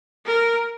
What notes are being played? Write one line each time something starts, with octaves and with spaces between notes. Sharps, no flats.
A#4